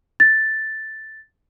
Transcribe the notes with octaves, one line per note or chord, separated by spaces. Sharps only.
A6